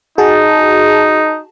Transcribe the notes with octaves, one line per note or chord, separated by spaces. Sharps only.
D#4 F#4 G#4 A5